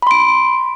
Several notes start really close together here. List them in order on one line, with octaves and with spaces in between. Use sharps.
B5 C6 D7